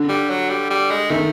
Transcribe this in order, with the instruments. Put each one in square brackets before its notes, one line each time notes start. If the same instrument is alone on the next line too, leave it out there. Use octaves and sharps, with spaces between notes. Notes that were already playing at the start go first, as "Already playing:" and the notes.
Already playing: [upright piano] D3
[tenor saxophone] G3
F#3
G3
G3
G#3
[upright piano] D#3 [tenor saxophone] A3